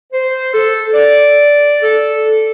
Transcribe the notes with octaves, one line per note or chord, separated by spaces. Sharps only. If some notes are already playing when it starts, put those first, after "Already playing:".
C5
A4
D5
A4